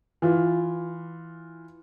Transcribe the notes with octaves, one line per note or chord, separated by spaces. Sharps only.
E3 F4